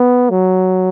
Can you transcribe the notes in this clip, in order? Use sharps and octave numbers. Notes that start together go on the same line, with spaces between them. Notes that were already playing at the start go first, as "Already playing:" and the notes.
Already playing: B3
F#3